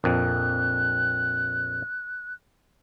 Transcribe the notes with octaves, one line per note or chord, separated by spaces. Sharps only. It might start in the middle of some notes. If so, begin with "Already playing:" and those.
A#1 F2 F#6